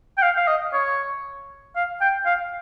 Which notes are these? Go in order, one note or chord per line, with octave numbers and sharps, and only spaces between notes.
G5
F5
F5
D#5
C#5
F5
G5
F5